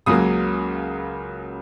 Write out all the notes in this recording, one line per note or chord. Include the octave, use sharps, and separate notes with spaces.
C#2 C#3 F#3 A#3 D#6